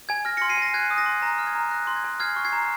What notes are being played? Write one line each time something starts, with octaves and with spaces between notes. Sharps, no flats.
G#5 G#6
F6 A#6
C6 A#6 C#7
C7 D#7
G#5 A#6
F#6 G#6
D#6
A#6
C6
A#5 A#6
F6
G#6
A#5
F#6 A#6
C6
G#6
G#5
F6 G#6 C7
C#6
G#6 C7
A#5